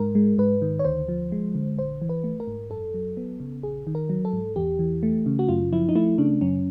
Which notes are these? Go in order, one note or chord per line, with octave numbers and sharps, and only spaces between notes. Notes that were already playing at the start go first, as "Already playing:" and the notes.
Already playing: G#2 A#4
G#3
G#2 B4
D#3
C#5
D2 C5
F3
G#3
D3
A#1 C5
E3
B4
A3
A#4
G#2
F#2 A4
F#3
B3
C#3
A#1 G#4
D#3
A#4
F#3
A4
G#2
E2 G4
E3
A3
C#3
F#4
F#2 F4
F3 E4
D#4
A3 E4
C#3 D4
F#2 C#4